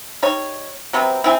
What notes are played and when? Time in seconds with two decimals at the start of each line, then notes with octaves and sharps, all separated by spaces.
0.22 G3 D#4 C#5
0.93 C3 F#3 B3 C4
1.24 C4 E4 G#5